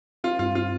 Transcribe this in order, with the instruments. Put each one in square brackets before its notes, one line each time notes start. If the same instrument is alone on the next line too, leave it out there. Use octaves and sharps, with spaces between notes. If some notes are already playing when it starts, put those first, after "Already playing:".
[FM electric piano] C4 [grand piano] F4
[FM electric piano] G2 [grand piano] F4
[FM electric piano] C4 [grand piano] F4